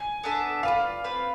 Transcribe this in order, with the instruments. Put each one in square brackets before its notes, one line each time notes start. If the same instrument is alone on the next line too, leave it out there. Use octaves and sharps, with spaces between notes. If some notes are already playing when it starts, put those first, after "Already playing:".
Already playing: [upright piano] G#5
[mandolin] B3 D4 A4 E5
[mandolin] F4 B4 D5 [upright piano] F5
[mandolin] C4 F4 B4